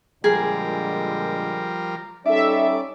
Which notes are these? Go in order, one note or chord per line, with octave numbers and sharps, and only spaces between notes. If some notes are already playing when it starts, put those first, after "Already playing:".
A#2 D3 F3 G3 G#3 G#4 A#4
G3 C#4 D#4 A4 D5 E5